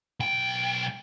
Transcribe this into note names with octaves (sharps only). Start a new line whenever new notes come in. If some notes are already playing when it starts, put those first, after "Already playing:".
B1 G5